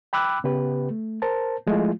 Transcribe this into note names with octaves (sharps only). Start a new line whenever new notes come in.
G5 B5 D6 E6 F#6
C#3 B3 G4 B4
A3
A#4 C5 A5
F3 G#3 A3 E4 F4